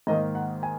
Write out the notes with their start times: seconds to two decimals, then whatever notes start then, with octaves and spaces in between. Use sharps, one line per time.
0.07 G#2 D#3 A#3 D#5
0.35 F#5
0.63 G#5